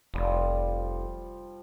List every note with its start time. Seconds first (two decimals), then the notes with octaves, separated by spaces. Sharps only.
0.14 F1 F3 G3 F4